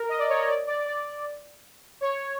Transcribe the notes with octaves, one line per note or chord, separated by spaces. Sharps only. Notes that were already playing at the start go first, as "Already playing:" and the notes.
Already playing: A#4
D#5
D5
C#5
D#5
D5
D5
D5
C#5